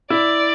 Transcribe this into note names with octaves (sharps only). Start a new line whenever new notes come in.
E4 D5